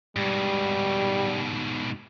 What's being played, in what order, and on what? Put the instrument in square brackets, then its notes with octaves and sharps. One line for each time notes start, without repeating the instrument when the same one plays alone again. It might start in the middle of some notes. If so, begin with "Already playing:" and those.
[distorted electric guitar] G#2 B2 [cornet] G3